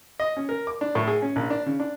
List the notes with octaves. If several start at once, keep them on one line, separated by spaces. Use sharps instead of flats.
D#5
C#4
A#4
D6
D4
A2
G#4
C#4
A#1
D4
C#3
D4